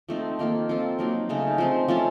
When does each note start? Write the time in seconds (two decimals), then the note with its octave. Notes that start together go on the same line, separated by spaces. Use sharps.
0.09 F3 A3 C4 D#4
0.39 D#3 A#3 F4 A4
0.69 F3 C4 F4 A4
0.99 F#3 A#3 D#4
1.29 C#3 A3 D#4
1.58 F3 C4 D#4
1.88 F3 A3 C#4 A4